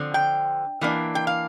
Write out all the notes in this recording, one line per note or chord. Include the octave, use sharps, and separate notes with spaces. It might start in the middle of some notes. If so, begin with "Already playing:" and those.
Already playing: D3 F3 C4
G5
E3 A#3 D4
G5
F5